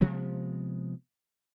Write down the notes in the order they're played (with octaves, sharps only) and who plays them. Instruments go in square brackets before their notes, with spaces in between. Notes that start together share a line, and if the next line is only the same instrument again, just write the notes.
[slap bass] C3 F3 G#3 B3